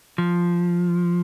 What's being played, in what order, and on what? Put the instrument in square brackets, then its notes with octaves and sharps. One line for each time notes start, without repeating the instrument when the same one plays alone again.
[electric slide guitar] F3